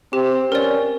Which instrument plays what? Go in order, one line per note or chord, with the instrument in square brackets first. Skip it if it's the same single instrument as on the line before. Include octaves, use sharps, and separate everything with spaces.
[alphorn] C4 [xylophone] G4
[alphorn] C#4 [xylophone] A#4 D5